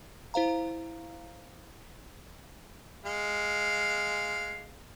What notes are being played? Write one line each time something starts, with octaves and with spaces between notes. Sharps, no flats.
E4 C5 F5 A#5
G#3 F5